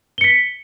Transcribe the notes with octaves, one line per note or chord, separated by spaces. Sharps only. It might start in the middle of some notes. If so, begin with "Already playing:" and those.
B6 C#7 G7